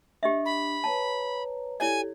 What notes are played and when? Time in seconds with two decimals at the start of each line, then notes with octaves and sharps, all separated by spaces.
0.23 D4 G4 D#5 E5
0.45 B5
0.84 B4 C#5 A5 A#5
1.80 E4 G4 A4 C#5 D5 G#5